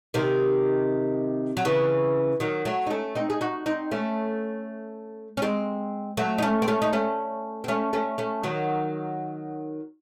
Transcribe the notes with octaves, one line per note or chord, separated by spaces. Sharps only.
C3 D#3
F#3
C#3 E3
D#3 F#3
F#3 A3
D#4
A3 C#4
C4 D#4
G#4
D#4 F#4
C4 D#4
A3 C#4
C#4
G#3 C4
F#3 A3
D#4
A3 C#4
C4
A3 C#4
D#4
A3 C#4
C4
A3 C#4
A3 C#4
A3 C#4
D#3 F#3